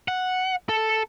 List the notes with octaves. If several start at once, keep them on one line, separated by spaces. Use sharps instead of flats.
F#5
A4